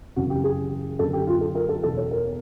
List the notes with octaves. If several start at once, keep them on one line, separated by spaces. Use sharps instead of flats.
F#2 C#3 E3 F#4
G4
G#4
F#2 D3 A4
G4
F4
A4
A#4
A4
E2 B2 A4
C#5
A#4